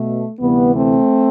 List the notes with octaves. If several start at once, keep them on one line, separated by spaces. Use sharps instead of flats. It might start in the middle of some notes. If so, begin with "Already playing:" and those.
Already playing: B2 A3
D2 C3 E3 G3 B3
A3 C4